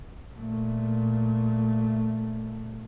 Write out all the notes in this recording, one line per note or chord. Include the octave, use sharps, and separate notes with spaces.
A#2 A3